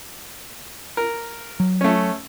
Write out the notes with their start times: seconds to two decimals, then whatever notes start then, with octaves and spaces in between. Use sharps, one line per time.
0.97 A#4
1.60 F#3
1.81 A3 C#4